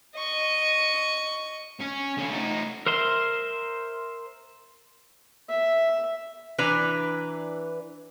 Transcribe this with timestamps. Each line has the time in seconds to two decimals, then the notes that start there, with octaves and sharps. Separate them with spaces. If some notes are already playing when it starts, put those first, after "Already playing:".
0.15 D#5 C#6
1.79 C#4
2.17 D3 C#4
2.29 A3 D#4
2.86 A#4 C5 E5 C6
5.49 E5
6.59 E3 D4 B4 A#5